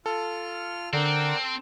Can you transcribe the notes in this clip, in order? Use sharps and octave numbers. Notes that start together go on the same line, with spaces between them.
F4 A4 F6
D3 C4 A#4 D5 F#5